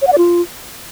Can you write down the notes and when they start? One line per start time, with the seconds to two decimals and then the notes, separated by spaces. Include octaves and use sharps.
0.02 C#5
0.07 F#5
0.12 D5
0.18 F4